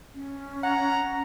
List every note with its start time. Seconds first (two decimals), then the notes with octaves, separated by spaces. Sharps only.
0.14 C#4
0.64 F#5 A#5